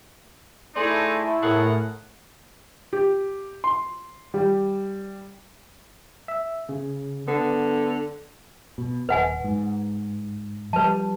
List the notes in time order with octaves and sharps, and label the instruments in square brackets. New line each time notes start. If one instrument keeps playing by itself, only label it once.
[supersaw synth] A3 E4 [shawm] D#4 [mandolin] G#4 C5 D5
[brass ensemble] A2 [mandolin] G#4 A#4 D#6 [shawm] F#5
[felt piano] G4
C6
G3
[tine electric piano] E5
C#3
[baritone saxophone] D3 [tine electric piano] B3
[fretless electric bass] B2
[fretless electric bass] D#1 [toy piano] B4 F#5 G#5
[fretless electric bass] G#2
[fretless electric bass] F3 G3 [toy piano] B4 A5